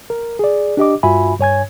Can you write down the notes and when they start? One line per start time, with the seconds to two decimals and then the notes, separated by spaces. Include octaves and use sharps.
0.10 A#4
0.39 G#4 D5
0.77 D4 G4 D#5 D6
1.03 G2 F4 F#4 E5 G#5 B5
1.39 G2 C#5 G#5 G#6